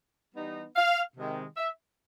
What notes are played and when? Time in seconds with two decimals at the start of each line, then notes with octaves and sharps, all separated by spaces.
0.34 E3 G3 B3 D#4
0.75 F5
1.16 C3 D#3 G#3
1.57 E5